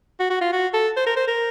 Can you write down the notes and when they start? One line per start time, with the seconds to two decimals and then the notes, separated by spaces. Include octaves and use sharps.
0.20 F#4
0.30 F#4
0.41 F4
0.52 F#4
0.74 A4
0.97 C5
1.06 A#4
1.17 C5
1.28 A#4